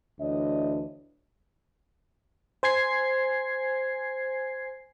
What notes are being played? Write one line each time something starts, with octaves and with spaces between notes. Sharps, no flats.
D2 E3 D4 C#5 D#5
C5 G#5 G#6 C7